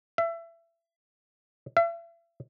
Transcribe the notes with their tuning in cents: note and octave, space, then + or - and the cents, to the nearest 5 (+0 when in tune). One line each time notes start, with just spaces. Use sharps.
E5 +25
E5 +40